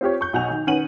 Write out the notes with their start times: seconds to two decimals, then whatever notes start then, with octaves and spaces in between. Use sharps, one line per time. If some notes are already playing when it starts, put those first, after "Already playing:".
0.01 C4 F4 G4 C#5
0.21 C#6 G6
0.33 B1 F#4 F#5 G#5 G6 F7
0.51 D#3
0.67 D#3 C#4 B4 F#5 D#7 F#7